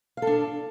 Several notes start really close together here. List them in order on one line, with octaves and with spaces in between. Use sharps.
F5 A4 D4